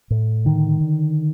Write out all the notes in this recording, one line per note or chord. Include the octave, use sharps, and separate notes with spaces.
A2
D3 D#3
D3